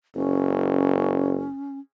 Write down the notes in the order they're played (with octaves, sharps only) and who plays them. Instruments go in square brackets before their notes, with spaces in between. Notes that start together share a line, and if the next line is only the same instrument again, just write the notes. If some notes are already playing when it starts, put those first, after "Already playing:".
[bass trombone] F#1 [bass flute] C#4